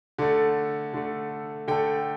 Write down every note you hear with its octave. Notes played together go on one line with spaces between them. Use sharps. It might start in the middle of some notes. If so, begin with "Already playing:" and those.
D3 A3
D3 A3
D3 A3 G5